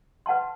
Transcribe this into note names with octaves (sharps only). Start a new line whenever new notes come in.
B4 F#5 A5 C6